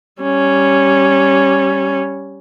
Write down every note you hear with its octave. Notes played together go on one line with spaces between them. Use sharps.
G3 C#4